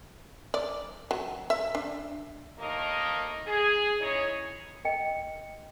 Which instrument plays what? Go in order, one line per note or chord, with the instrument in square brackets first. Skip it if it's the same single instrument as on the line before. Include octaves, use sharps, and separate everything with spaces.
[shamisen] D5
F#3
E5
D4
[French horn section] D#2 A3 A#3 D#4 A#4 D#5
G#4
C#4 D#4 E4 G#4 C#5
[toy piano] D#5 G5